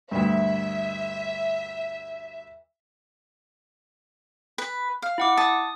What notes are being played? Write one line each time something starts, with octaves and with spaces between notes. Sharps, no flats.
D2 G2 E5
B4
F5
E4 F#5 D6
A5 D#6